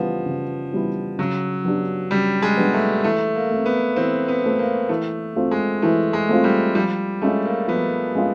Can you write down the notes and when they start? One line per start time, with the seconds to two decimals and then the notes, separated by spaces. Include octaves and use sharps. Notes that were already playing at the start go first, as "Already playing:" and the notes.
Already playing: C#3 E3 F3 G3 B3 E4
0.26 C#3
0.72 E3 G3 B3 E4
1.19 C#3 F#3
1.65 F#3 B3 D4 G4
2.11 C#3 G3
2.42 G#3
2.57 F#3 B3 D4 G4
2.73 A3
3.04 E3 A3
3.35 A#3
3.51 A3 C4
3.66 B3
3.96 E3 C4
4.28 B3
4.44 A3 C4
4.59 A#3
4.89 E3 A3
5.36 A3 C4 F4
5.51 G#3
5.82 E3 A3
6.13 G#3
6.29 A3 C4 F4
6.44 G3
6.75 F3 G3
7.21 G#3 A3 C#4 F4
7.45 A#3
7.68 F3 B3
8.15 G#3 C#4 F4